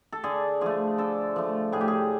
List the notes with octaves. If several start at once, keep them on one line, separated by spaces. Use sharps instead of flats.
A4
D3 G#4
F3 A3 G#4
D3 A4
F3 A3
A2 G#4
G4
G#4